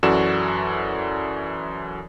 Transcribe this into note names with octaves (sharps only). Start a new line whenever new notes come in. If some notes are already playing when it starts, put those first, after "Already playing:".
F#2 E3 F#4 A4 D5 E7